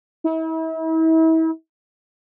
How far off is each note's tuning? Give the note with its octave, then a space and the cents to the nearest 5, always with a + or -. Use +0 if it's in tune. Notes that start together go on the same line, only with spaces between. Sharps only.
E4 -40